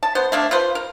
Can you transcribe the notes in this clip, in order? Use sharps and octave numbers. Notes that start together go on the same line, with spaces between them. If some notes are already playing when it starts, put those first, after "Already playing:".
A5
B3 C5
A3 A#3 D4
F4 B4 C5
A#4